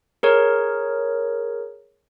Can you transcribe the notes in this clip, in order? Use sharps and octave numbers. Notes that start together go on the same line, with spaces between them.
G#4 A#4 C#5